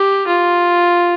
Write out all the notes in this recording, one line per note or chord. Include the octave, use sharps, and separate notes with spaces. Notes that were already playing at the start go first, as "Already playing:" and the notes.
Already playing: G4
F4